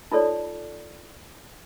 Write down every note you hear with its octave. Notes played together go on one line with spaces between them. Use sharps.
D#4 F4 A4 C#5 D5